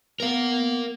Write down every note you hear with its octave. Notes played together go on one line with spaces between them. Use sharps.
B3 A#4 F5